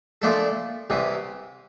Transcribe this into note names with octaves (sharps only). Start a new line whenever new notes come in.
A#2 F3 A3 D4 A4
C2 C3 E3